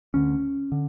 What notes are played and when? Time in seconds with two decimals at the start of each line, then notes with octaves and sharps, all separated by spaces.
0.14 D2 D3 C#4
0.72 D3